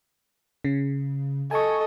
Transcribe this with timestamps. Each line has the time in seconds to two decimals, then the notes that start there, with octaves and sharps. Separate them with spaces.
0.64 C#3
1.51 A4 D#5 G#5 C#6